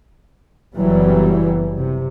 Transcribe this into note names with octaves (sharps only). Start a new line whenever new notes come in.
F#1 F#2 E3 F#3 G3 B3
C3